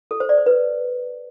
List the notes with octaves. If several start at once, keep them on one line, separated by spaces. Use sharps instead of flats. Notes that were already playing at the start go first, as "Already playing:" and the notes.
A4
C5
D5
C5
B4